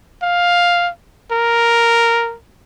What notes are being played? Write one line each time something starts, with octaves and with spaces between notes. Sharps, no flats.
F5
A#4